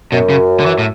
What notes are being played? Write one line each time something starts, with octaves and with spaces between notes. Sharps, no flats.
F#2 B2
C#3
D3
E3
A2